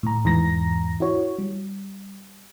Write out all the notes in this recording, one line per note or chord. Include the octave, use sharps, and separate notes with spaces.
A2 A#5
E2 G#2 E3 A#5 A#6
E4 F#4 C#5
G3